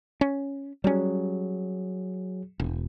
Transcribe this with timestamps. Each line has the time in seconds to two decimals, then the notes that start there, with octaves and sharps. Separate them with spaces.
0.21 C#4
0.84 F#3 G3 C#4 G#4
2.60 E1